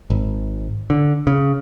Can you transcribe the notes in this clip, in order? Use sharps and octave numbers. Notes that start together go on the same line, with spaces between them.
G#1
D3
C#3